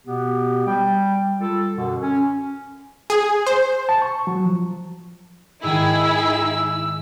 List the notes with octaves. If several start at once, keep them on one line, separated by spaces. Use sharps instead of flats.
B2 B3 G4
G3 G5
G3 F4 A4
F#2 B2 D3
C#4
G#4
C5
A5
C#6
F#3
F3
G#2 D#3 E4 G#4 G5 E6